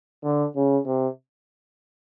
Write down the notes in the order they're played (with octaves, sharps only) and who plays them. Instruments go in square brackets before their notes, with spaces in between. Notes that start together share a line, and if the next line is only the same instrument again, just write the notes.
[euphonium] D3
C#3
C3